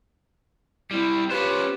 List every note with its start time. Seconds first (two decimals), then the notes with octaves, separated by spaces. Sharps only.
0.91 G3 C4 E4
1.30 C#4 F4 G4 B4 C5